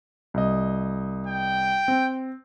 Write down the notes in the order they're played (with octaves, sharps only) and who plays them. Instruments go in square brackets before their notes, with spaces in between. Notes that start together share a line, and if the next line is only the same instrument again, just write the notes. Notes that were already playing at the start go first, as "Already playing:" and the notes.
[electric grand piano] C2 D#5
[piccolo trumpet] G5
[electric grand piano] C4